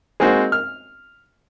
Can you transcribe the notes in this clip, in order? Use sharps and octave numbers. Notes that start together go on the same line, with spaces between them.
G#3 A#3 C4 D#4 F#4
F6